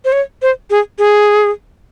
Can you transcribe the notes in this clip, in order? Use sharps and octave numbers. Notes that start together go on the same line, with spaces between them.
C5
C#5
C5
G#4
G#4